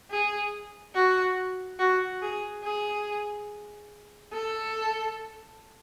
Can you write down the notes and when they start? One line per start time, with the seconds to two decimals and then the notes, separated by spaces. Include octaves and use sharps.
0.11 G#4
0.95 F#4
1.79 F#4
2.22 G#4
2.64 G#4
4.32 A4